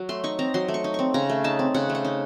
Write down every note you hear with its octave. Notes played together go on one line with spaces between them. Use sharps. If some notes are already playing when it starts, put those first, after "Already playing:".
Already playing: F#3
A3 C6
D#4 C#6
C4 A#5
F#3 C6
A3
C#6
D#4
C4 C#6
C#3 A#5
A3
D#4 A5
C4
C#3 F#5
A3
F#5
D#4